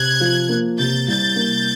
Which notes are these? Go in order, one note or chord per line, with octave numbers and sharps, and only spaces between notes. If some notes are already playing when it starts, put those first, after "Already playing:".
Already playing: C3 F#6 G#6
F3
A#3
C3 G6 A6
C2 G6 A6
A#3